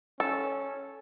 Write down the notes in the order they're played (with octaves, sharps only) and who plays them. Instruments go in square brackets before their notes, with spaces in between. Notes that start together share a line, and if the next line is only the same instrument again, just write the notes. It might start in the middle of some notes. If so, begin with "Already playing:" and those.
[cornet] C#4 [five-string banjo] A4